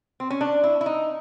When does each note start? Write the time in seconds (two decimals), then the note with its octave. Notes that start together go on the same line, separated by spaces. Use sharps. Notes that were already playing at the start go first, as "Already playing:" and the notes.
0.20 C4
0.30 C#4
0.41 D4
0.64 E4
0.81 E4
0.86 D#4